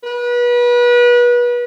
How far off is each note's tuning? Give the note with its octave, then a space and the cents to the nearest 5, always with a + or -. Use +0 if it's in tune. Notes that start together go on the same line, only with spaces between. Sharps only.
B4 -30